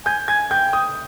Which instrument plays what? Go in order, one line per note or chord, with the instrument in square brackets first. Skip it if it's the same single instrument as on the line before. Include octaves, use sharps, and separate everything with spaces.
[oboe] G#5 [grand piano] G6
[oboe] G#5 [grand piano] G#6
[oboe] G5 [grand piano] G6
[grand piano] D#6